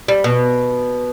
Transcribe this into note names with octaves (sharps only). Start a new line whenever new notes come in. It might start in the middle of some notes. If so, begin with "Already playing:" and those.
G3
B2